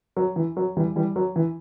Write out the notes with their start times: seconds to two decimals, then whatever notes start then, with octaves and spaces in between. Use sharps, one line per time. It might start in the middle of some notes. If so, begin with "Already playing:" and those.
0.17 F#3
0.36 E3
0.57 F#3
0.77 E3 G3
0.96 E3 G3
1.16 F#3
1.36 E3